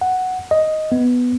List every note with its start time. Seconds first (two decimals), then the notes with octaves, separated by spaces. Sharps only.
0.01 F#5
0.51 D#5
0.92 B3